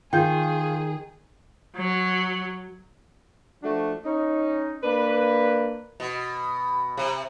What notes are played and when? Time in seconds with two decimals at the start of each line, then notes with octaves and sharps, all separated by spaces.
0.13 D#3 F4 G#4 G5 G6
1.76 F#3
3.63 F3 A3 D4 F#4
4.05 C#4 D#4
4.83 A#3 D4 B4
6.00 B2
6.97 C3